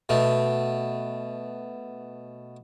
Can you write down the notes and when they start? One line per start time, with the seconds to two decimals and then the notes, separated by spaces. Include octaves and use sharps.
0.09 B2 A3